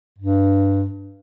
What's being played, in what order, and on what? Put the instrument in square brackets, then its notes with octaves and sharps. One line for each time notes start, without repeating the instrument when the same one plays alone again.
[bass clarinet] G2